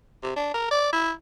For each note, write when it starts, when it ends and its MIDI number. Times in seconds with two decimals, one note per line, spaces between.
0.23 0.34 48
0.36 0.49 62
0.54 0.69 70
0.71 0.93 74
0.93 1.11 64